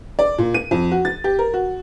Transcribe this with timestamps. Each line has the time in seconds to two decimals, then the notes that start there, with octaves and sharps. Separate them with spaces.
0.19 D5
0.38 A#2
0.54 D#7
0.71 F2
0.91 F#4
1.05 A6
1.24 G4
1.39 A#4
1.54 F#4